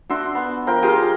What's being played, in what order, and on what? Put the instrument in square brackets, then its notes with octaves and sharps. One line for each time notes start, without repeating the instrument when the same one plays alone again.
[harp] D4 [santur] F#4 E5 C6
[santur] B3
F3 A#4 G5
[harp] F4 G4 G#4 [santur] A#4 F5
[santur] A#4